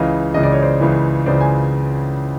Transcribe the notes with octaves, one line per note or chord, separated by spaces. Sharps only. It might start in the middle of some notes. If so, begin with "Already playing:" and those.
Already playing: C#2 C#3 E3 D#5 F5
C#2 C#3 E3 D#5
D5
C#5
C5 D5
C#2 C#3 E3
C#2 C#3 E3 C5 D5
G#5